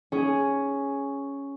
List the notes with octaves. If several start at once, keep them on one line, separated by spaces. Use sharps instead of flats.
C#4 G#4